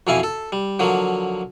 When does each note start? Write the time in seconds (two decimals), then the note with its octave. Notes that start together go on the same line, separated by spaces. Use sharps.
0.07 F2 B2 E3 E4 F5 G#5
0.23 A4
0.52 G3
0.79 D3 F3 F#3 A#3